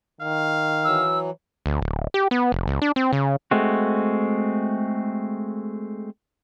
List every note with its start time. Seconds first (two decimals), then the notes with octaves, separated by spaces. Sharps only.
0.21 D#3 F5
0.84 E3 F#3 E6
1.66 D2
1.82 D1
2.14 G4
2.31 B3
2.52 F1
2.67 C#2
2.82 D4
2.96 C4
3.13 C#3
3.51 G#3 A3 C4 F#4